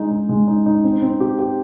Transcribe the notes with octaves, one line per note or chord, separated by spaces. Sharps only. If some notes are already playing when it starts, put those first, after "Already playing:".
Already playing: G#3 D#4
D#4
G#3
D#4
D#4
C4
C4
G4
G4